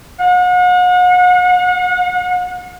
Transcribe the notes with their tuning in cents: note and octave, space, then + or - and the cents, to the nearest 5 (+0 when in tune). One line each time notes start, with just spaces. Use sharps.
F#5 -40